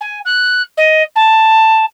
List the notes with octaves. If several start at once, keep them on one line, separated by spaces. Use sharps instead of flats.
G#5
F#6
D#5
A5